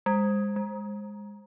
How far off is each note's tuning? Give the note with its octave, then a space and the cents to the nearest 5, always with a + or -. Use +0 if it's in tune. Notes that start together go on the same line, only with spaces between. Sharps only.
G#3 -35
G#3 -15